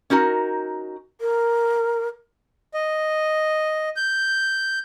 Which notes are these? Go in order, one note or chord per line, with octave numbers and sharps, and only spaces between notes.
C#4 D#4 F#4 A#4
A#4
D#5
G6